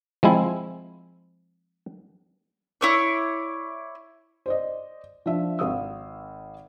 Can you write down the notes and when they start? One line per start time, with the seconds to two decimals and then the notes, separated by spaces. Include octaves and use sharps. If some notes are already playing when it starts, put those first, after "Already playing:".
0.23 F3 G#3 C4 E4
2.81 E4 C#5 D5
4.46 C5 D5 D#5
5.26 F3 D4 E5
5.59 G#1 F5 D#6 E6